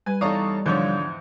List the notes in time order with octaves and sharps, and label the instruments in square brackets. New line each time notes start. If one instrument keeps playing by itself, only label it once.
[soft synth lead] G3 [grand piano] B4 [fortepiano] G#5
[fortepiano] E2 C#5 D5 [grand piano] D#4 A4 F5 [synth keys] A#5 D#6
[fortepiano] E2 G#2 [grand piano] D3 D4 C#5 [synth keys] F3 G6 G#6